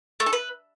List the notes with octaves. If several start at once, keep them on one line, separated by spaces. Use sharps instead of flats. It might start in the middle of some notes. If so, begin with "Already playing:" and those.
A3
A4
B4